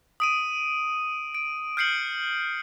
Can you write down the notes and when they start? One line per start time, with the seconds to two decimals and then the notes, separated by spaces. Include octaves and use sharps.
0.20 D#6 D7 D#7
1.35 D7
1.77 F6 G6 C7 C#7 F#7